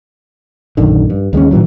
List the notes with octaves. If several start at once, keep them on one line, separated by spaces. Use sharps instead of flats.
A#1 F#2 D3 D#3
G2
D#2 G#3 A#3 C#4
A2 D#3 E3 F#3